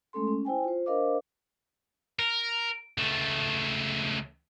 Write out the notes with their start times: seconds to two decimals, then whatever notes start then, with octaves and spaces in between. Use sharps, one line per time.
0.13 G#3 A3 C#4 A4 C6
0.27 C#4
0.45 E4 C5 G5 G#5
0.64 F4 C5
0.86 D4 A#4 C5 D#5 F5 D6
2.19 A#4
2.98 C#2 A3